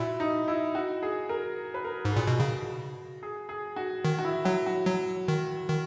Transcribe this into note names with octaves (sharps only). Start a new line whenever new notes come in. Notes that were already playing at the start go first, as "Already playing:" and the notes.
Already playing: A#2 E4 F#4
D#4
E4
F#4
G#4
A#4
B4
A#4
G#2
G#4
A#2
B2
C#3 F#4
G#4
G#4
F#4
D#3
F#4
E4
F#3 F#4
F#4
F#3
D#3
D#3